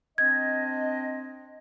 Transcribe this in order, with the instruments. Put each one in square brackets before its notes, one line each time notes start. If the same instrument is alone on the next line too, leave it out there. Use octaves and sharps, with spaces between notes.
[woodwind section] C4 D4 D#5 [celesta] G#6